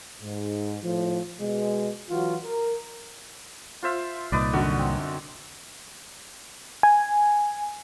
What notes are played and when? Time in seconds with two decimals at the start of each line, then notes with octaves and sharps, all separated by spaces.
0.21 G#2
0.83 A2 F3
1.39 B2 G#3
2.09 E3 F#3 F4 F#4
2.42 A#4
3.83 F4 C5 E5
4.32 C2 A#2 D#4 B4 D5
4.53 F#2 D3 F#4
4.79 C4
6.83 G#5